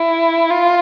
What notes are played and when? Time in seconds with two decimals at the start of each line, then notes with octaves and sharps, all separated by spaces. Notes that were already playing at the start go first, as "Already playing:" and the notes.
Already playing: E4
0.50 F4